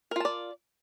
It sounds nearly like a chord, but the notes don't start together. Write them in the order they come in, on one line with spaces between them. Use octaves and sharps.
A#4 F4 A5 D5